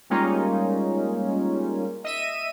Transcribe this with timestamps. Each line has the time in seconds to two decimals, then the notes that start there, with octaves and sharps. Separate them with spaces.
0.10 G3 G#3 A#3 C#4 D#4 F4
2.04 D#5 E5 D#7